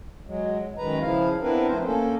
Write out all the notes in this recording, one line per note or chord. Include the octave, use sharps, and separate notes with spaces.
F#3 G#3
F#2 D#3 G#3 B4 A#5
C#3 F3 E4 F5
B3 C4 D4 E4 A#4 B4
F3 A3 C4 C5
A#3 C#4 A4